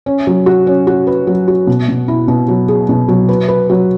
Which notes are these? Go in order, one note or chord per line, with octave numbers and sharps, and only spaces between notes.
C#4
F#3
F#4
C#4
F#4
B4
F#3
F#4
B2
B2
E4
B2
F#3
G#4
B2
F#3
B4
B4
F#3